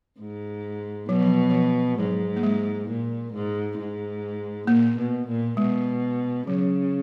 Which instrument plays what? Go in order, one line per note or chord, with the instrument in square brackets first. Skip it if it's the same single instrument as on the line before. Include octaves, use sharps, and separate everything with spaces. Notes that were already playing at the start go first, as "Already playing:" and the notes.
[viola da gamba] G#2
[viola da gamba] B2 [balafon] F#3
[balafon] F3
F3
[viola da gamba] G#2 [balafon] F#3
[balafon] A#3
G#3
[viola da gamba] A#2
G#2
G#2
[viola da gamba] A#2 [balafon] A#3
[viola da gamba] B2
A#2
[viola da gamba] B2 [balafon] G#3
[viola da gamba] C#3 [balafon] F#3